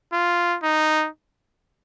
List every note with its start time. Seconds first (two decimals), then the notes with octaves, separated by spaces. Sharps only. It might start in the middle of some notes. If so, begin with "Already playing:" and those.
0.13 F4
0.63 D#4